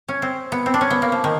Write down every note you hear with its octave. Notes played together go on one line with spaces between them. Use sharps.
C#4
C4
B3
C4
D4
C#4
B3
A#3
F3
D#3